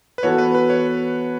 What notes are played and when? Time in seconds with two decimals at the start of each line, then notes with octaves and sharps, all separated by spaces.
0.18 B4
0.23 E3 B3 F#4 A4 C#5
0.38 B4
0.55 B4
0.70 C#5